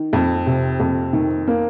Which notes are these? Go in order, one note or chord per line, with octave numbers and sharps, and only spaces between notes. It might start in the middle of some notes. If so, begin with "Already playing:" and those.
Already playing: D#3
F2
C3
F2
D#3
A#3